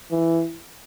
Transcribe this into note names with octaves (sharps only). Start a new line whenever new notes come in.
E3